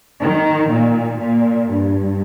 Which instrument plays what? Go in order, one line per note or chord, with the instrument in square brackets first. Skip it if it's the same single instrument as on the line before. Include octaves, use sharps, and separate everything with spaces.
[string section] D#3
A#2
A#2
G2